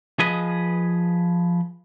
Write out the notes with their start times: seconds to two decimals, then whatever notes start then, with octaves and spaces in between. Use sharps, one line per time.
0.19 F3 G#4 B4 D#5